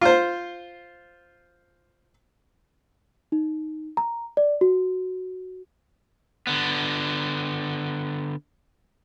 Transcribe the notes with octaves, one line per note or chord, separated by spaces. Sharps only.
F4 C5
D#4
A#5
D5
F#4
D3 B3